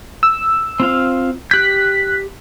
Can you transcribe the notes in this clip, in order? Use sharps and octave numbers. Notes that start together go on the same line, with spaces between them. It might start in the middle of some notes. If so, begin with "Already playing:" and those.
E6
C4 F4 F5
G4 F#6 G6 B6